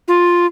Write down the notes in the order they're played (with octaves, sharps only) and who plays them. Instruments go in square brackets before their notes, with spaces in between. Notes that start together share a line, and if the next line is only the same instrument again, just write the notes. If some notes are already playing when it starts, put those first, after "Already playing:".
[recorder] F4